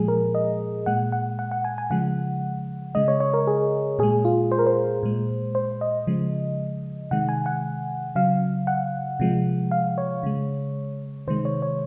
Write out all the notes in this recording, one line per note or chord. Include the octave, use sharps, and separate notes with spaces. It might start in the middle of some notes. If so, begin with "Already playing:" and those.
Already playing: A#2 F3 G#3 G#4
A#4
D#5
A#2 G#3 F#5
F#5
F#5
F#5
G#5
G#5
C#3 F3 G#3 F#5
C#3 G#3 D#5
C#5
C#5
A#4
G#4
A#2 G#3 G#4
F4
C5
A#4
C5
A#2 G#3
C5
D#5
C#3 F3 G#3
C3 D#3 G#3 F#5
G#5
F#5
C#3 F#3 F5
F#5
C3 F3 G#3
F5
C#5
C#3 G#3
C3 D#3 G#3 C5
C#5
C#5